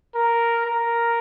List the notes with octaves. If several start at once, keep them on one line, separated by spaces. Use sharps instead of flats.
A#4
A#4